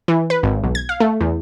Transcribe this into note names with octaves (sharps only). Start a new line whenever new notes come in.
E3
B4
G#1
B1
G#6
F5
A3
E2